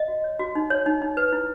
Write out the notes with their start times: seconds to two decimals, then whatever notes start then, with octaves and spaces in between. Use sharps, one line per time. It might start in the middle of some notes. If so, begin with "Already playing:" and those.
Already playing: D#5
0.08 F#4
0.24 C#5
0.39 F#4
0.55 D#4
0.70 C#5
0.86 D#4
1.02 D#4
1.17 B4
1.33 E4